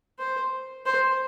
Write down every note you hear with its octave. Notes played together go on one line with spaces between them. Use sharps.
C5
C5